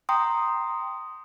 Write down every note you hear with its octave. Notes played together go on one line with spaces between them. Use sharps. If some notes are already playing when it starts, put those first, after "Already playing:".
G5 A#5 C6 D#6